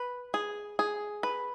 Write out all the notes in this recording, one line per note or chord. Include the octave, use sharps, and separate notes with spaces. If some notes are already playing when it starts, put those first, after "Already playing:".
Already playing: B4
G#4
G#4
B4